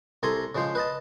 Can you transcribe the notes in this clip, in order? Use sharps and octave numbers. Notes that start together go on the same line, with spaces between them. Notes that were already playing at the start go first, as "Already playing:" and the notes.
C2 A4 G#5 A#5 C6
C#3 F3 G#3 C5
B4 D#5 A5